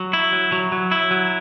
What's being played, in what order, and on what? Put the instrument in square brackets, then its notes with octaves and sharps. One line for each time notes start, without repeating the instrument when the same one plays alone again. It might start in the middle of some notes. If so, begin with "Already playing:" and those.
Already playing: [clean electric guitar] F#3
E4
F#3
F#3
F#3
E4
F#3